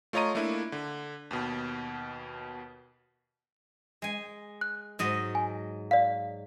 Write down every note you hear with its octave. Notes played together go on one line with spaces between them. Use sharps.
A3 F4 C#5 D#5 A#5 D#7
A3 A#3 D4 E4
D3
D#2 B2
G#3 G#5
F#6
G#2 F#3 D#5
G#5
D5 F5